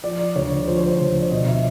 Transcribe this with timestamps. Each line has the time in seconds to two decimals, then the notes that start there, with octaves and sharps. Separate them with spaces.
0.04 F3 D5
0.36 D2 C#5
0.68 F3 C5
0.77 C#5
0.88 C5
1.00 D2
1.20 D5
1.31 B2 D#5
1.47 E5